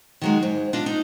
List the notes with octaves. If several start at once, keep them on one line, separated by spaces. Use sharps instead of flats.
D#3 F#3 G#3
G#2
D4 F4 D#5
D#4